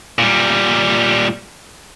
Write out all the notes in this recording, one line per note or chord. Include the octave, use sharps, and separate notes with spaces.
A#2 G3